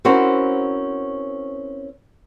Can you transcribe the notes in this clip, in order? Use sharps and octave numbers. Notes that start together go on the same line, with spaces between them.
C4 C#4 E4 F#4 A#4 C5